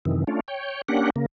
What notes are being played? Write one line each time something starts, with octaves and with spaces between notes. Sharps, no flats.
F#2 C3 D#3 E3
A3 C#4 D4 F4
C#5 G5
A#3 C#4 D4 G4 F#5
C#3 A#3